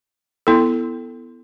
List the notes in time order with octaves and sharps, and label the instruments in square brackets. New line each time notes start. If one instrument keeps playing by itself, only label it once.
[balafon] B3 E4 A4